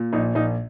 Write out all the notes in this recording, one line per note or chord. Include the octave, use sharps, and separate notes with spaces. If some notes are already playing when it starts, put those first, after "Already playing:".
Already playing: A#2
A#1 D#4
A#1 D#4